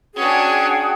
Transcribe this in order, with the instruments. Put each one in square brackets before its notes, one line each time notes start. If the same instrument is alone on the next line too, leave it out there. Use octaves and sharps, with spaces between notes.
[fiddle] C#4 D4 [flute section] F#4 G#4 G5